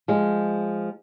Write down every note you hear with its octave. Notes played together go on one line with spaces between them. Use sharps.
F3 G#3